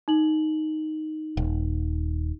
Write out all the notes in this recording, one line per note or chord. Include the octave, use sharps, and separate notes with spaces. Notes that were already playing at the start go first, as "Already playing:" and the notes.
D#4 F#7
D#1